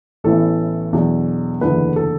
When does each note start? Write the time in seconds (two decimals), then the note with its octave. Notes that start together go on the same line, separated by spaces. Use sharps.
0.24 A1 A2 E3 B3 A4
0.93 E2 B2 F#3 D4
1.61 F#1 E2 D3 A3 B4
1.96 A4